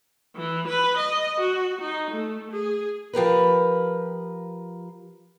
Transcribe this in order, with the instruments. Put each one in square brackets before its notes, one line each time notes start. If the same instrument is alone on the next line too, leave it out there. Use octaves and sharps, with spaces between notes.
[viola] E3
B4
D#5
F#4
D#4
A3
G#4
[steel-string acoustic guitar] F3 G4 A#4 B4